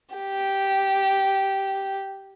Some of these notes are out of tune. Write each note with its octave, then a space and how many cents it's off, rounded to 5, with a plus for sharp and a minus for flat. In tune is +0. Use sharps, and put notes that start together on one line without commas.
G4 -10